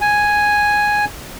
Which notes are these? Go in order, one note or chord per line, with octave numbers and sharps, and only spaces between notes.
G#5